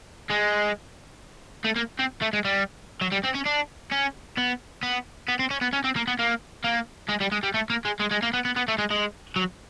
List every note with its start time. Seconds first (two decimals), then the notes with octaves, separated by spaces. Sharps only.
0.30 G#3
1.65 A3
1.76 A#3
1.99 C4
2.22 A3
2.33 G#3
2.45 G3
3.01 F#3
3.12 G3
3.25 C4
3.35 C#4
3.46 D4
3.91 C#4
4.37 B3
4.83 B3
5.28 B3
5.39 C4
5.51 C#4
5.62 B3
5.73 C#4
5.84 C4
5.96 A#3
6.07 B3
6.19 A#3
6.64 A#3
7.09 G#3
7.20 G3
7.32 G#3
7.43 G3
7.54 A3
7.70 A#3
7.85 G#3
8.00 G#3
8.11 G#3
8.23 A#3
8.34 B3
8.45 B3
8.56 B3
8.68 A3
8.78 G#3
8.91 G#3
9.36 F#3